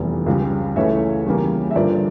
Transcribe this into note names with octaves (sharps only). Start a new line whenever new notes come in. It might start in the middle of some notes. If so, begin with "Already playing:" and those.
Already playing: F1 E2 E3 G3
C#2 C#3 G3
C#2 C#3 E3 A3 C#5 E5
E2 C#3 G3 A#3
E5
G2 D3 F3 A#4 D5